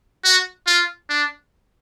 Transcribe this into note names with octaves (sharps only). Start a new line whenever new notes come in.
F#4
F4
D4